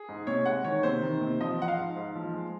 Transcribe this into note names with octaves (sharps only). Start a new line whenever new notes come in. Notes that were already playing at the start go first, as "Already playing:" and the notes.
Already playing: G#4
G#2
C3 C#5
G#3 F#5
D#3 C#5
C3 C5
D#3
C3
F3 D#5
F3 F#5
F5
G#2
G#2
F3
G#3